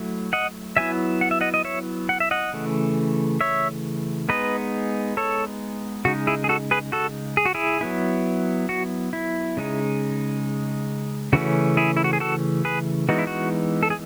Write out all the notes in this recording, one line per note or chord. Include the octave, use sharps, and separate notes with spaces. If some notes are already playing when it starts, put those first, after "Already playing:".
Already playing: F#3 A3 E4
D#5 F#5
F#3 B3 E4 E5 G#5
F#5
E5
D#5 F#5
D#5
C#5 E5
F#5
E5
D#5 F#5
C#3 E3 A3
C#5 E5
G#3 B3 D#4 B4 D#5
A4 C#5
C#3 G#3 D#4 F#4
E4 G#4
G#4
F#4 A4
G#4 B4
F#4 A4
G#4
F#4
E4 G#4
F#3 B3 E4
F#4
E4
C#3 G#3 D#4
C#3 E3 A3 C#4 F#4
E4 G#4
E4
F#4
G#4
F#4 A4
G#4 B4
E3 G#3 B3 D#4 F#4
E4
F#4
A4
G#4